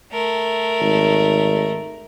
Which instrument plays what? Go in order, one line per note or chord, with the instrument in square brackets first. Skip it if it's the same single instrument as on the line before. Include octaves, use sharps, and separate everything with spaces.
[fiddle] A3 A#4
[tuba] G#1